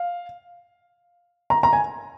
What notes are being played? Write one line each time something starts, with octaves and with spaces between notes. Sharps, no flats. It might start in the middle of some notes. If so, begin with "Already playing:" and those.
Already playing: F5
A#5
A#5
G#5